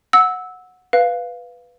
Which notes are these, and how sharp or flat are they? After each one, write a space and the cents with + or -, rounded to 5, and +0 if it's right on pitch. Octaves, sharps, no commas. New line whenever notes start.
F#5 -15 E6 -15
B4 +0 F5 +0